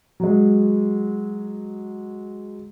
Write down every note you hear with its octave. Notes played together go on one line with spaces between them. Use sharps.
F#3 G#3